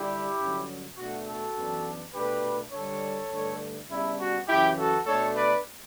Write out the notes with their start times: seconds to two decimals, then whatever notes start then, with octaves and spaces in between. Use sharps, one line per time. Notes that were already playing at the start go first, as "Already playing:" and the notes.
Already playing: D3 G3 D4 E4 G4
0.38 G2 D3 F#3 C#4
0.97 B2 A3 D4 F#4
1.26 F#4 A4
1.56 F#2 E3 B3 D4
2.13 B2 A3 D4 G4 B4
2.72 D3 G3 D4 A4 C#5
3.31 G2 D3 A3 D4
3.90 C#3 G3 B3 D4 E4
4.19 F#4
4.48 F#2 C#3 E3 E4 G4
4.77 F#4 A4
5.06 B2 A3 D4 A4 C#5
5.36 B4 D5